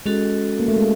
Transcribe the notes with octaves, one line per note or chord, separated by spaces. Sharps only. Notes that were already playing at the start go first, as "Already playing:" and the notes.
G#3 C#4 F#4 A4
A#3
A3
G#3